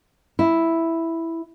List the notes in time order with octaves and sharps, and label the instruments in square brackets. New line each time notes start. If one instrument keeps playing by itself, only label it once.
[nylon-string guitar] E4